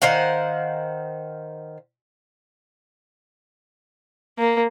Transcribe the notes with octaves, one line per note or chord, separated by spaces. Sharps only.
D#3 C5 F5 F#5
A#3